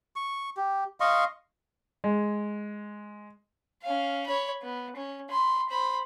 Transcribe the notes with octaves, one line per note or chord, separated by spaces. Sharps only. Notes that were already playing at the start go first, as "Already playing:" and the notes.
C#6
G4
D#5 F5 C6 C#6
G#3
C#4 F5
C#5 B5
B3
C#4
B5 C6
C5 B5